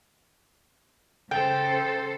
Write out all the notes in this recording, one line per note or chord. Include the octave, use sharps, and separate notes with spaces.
C#3 A4 C5 G5